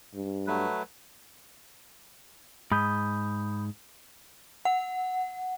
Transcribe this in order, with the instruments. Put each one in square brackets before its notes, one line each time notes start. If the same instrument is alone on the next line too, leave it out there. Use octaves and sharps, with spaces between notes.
[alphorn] G2
[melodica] F#3 A3 B4
[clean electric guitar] G#2 [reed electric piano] B5 D#6 G6
[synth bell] F#5